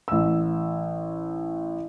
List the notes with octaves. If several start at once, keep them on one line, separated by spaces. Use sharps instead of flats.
A1 E6